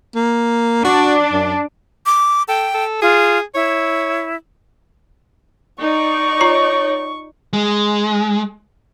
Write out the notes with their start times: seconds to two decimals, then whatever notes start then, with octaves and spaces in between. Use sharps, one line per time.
0.15 A#3
0.85 D4 F#4
1.32 F#2
2.06 D6
2.48 A4 G5
2.74 A4
3.02 F4 G#4
3.55 E4 C#5
5.82 D#4 D5 C#6
6.41 F4 C#5 A#5
7.53 G#3